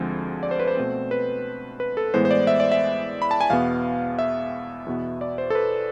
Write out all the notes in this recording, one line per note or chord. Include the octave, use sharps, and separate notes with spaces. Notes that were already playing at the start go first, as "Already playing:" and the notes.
Already playing: D2 D3 F3 G#3 C4
D5
C5
B4
C5
B2 A3 C4
B4
B4
A4
A2 E3 G#3 B3 C5
C5
D5
E5
D5
E5
B5
A5
G#5
E2 B2 B3 F5
E5
E2 B2 B3
D5
C5
A4
B4